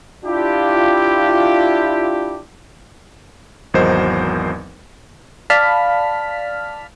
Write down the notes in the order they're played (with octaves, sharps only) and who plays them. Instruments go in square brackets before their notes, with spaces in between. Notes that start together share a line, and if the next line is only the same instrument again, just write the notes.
[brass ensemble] D4 E4 F4 G4
[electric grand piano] G#1 E2 F#3 A#4 C5 D#5
[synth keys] D5 F5 A5 B5 F6 B6